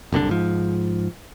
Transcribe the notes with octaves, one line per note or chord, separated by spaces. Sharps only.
F#1 C2 D3 D4
G#2 F3